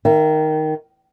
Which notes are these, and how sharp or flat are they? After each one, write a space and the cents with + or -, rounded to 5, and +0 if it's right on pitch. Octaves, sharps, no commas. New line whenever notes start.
D#3 +0 E5 +40